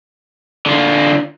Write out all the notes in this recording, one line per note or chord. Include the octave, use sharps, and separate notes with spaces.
D3 F4